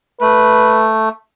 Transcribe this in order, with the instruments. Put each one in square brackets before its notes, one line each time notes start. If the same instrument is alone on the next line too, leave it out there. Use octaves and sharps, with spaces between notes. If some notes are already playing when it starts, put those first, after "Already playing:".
[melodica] A3 [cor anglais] B4